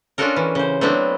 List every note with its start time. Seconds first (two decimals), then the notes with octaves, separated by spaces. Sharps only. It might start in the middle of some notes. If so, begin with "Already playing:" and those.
0.18 C#4 D4 F4 F#4 A4 A#4
0.36 E3
0.55 C#3 C5
0.81 F#3 A3 B3 C4 D4 E4